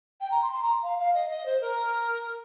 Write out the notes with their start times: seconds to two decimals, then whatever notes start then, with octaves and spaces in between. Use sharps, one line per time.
0.21 G5
0.31 A#5
0.42 C6
0.53 C6
0.62 A#5
0.83 F5
0.98 F5
1.14 D#5
1.29 D#5
1.46 C5
1.61 A#4